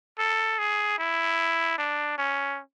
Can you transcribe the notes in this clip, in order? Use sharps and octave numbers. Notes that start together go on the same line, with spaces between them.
A4
G#4
E4
D4
C#4